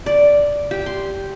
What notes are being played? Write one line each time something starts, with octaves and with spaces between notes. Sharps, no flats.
D5
G4
C6